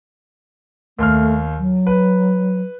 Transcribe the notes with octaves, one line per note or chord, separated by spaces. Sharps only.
D#2 A3 C6 F6
F#3
B4